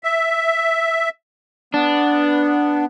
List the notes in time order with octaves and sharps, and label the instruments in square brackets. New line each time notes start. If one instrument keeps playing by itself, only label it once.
[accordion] E5
[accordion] B3 [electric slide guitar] D4